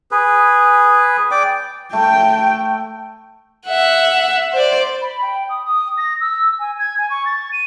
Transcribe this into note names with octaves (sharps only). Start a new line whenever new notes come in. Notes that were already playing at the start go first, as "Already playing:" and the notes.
G#4 B4
D5 G5 D6
A3 G5
E5 F#5
C5 D5
B5
G5
D#6
D#6
A#6
E6
G#5
G#6
G#5
C#6
A6
D#7